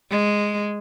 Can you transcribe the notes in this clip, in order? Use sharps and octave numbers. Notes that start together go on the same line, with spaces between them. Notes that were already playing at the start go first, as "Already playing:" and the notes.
G#3